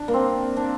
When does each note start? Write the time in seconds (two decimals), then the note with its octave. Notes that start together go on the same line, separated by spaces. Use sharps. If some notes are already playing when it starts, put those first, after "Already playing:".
Already playing: D4
0.08 A#3
0.14 C4
0.57 D4